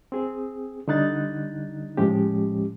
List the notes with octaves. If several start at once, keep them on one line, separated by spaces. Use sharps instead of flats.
C4 G#4
D3 G3 D#4 F#6 A6
A2 F3 G#3 C#4 G4